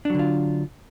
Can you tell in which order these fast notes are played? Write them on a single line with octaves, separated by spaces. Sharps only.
D4 F#3 D3 F4